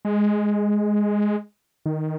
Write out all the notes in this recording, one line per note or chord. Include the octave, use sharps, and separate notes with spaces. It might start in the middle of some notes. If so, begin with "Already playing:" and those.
G#3
D#3